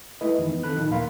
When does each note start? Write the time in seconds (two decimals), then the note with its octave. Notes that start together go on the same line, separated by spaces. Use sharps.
0.21 G#3 A3 E4 B4 D#5
0.38 F2 D#3 E3
0.50 B3
0.63 D#3 C4 A4 B5 F#6
0.77 A2 D#3 F3
0.90 D2 A#2 A#4 F5 B5 C6